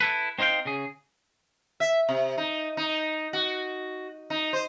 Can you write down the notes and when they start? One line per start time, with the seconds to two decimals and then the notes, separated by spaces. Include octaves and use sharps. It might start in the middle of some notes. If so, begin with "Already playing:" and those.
0.01 E4 A4 B4
0.39 C4 D#4 C5 F5 G5
0.65 C#3 G#4
1.80 E5
2.09 C3
2.38 D#4
2.77 D#4
3.33 F#4
4.30 D#4
4.53 C5